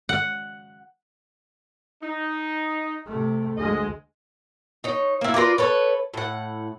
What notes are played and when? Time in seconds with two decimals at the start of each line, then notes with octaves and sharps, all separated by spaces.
0.09 F#5
2.03 D#4
3.06 C3 A3
3.57 D2 G#3 G#4 D#5
4.84 D#4 C#5
5.21 A#3 E4
5.34 F4 A#4 B4 D5
5.58 A4 B4 C#5
6.14 A2 F#5